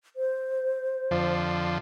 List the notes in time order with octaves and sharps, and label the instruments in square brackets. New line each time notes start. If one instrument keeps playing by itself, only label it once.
[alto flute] C5
[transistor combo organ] F2 D3 F3